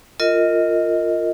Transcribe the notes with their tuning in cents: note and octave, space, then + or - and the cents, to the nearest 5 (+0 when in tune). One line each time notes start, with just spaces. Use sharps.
F4 +0 A#4 -25 D#5 +15